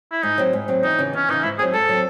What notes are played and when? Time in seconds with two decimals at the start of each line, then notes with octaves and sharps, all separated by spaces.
0.12 E4
0.23 G#2 D#4
0.38 F#3 C4
0.53 G#2
0.68 F#3 C4
0.83 E2 D#4
0.99 C#3 E3
1.13 E2 C#4
1.29 C#3 E3 D#4
1.43 G#2 E4
1.59 F#3 C4 G#4
1.73 G#2 A4
1.89 F#3 C4